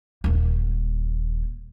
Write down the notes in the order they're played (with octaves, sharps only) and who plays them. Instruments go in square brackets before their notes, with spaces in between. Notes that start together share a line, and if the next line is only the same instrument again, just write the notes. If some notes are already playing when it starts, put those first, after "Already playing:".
[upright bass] D#1 A#3